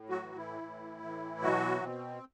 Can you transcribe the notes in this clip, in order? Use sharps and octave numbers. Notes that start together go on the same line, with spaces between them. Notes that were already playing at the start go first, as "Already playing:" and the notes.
Already playing: A2
F#3 F#4
E3
E3 E4
A2
E3
B2 F#3 F#4
B2 C4